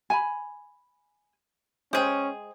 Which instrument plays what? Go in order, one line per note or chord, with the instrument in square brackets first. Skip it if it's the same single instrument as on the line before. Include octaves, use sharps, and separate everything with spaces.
[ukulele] G#5 A5 B5
[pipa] G#3 G#4 [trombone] C#4 [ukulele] C5 G5